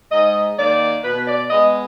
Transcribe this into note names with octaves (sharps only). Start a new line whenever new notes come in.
G#2 D#5
D#3 A#3 D5
B2 B4
D5
G#3 B3 D#5